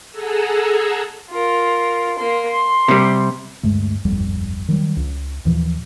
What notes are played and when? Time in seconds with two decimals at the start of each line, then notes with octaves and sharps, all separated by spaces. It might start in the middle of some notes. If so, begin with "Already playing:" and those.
0.11 G#4 A4 F#5 G#5 A#5 E6
1.30 F4 A#4
2.18 A#3 C6
2.50 C6
2.88 C3 G3
3.63 D2 G2 G#3 A3
4.05 D1 G1 F2 G3
4.68 D#3 F#3 G3
4.97 C#2
5.45 D#2 A#2 E3 F3